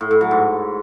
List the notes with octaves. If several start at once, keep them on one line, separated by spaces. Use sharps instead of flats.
A2
A2
F#3
G#2